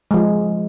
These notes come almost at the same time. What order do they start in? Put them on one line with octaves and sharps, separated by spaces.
G#3 F3 F4